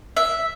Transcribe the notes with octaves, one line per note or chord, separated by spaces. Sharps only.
E5